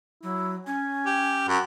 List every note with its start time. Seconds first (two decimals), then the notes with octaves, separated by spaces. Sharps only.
0.23 F#3 E4
0.67 C#4 G#5
1.06 G4
1.48 F#2 F#5